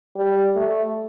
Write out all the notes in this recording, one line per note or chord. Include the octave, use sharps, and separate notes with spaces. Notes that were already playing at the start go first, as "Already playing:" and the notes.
G3
A3